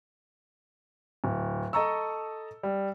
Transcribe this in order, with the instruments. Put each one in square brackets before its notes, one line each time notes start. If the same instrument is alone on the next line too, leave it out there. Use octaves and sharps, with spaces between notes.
[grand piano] D1
A4 D#5 A5 A#5 C#6 E6
G3